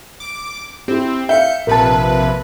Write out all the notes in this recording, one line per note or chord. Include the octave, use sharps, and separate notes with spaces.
D6
C4 E4 G4
E5 F5 G6 C#7
A#1 C3 A#4 B4 A5